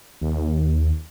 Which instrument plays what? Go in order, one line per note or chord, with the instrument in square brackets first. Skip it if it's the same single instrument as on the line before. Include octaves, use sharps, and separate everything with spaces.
[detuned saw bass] D#2